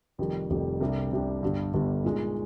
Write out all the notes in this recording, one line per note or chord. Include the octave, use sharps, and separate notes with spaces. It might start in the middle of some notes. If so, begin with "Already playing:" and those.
F1 F2 D#3 G3
F1 F2 D#3 G3
C2 C3 G3 D4
C2 C3 G3 D4
G1 G2 D3 G3
G1 G2 D3 G3
A#2 G#3 D#4